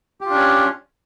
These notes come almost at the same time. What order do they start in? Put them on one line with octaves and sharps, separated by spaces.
G4 F4 D4 C#4